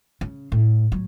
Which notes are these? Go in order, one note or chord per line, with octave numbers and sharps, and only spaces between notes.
C#3
A2
F#3